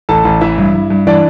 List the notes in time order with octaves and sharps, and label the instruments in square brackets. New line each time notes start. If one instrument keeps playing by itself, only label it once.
[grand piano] A1 A4 A5
A1
E3 E4 E5
G2
G2
G2
E3 D4 D5